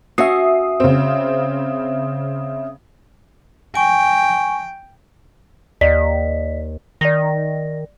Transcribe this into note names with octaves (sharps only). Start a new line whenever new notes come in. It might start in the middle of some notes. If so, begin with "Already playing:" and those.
C#4 F#4 E5 D#6 C7
C#3 C4
G5 G#5 C#6
D#2 D5 D#5 B6
D#3 D5 A#6